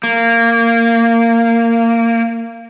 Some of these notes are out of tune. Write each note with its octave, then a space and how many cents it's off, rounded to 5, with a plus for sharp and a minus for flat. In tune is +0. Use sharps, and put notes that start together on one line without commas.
A#3 -15